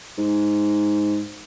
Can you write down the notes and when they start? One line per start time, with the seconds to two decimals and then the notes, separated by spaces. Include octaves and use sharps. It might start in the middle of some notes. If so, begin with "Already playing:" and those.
0.18 G#2